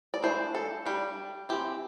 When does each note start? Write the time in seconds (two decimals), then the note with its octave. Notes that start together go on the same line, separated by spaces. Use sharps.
0.14 D5
0.23 E3 A3 D4 C5
0.55 A4
0.86 G3 D4 G4
1.49 E3 C4 G4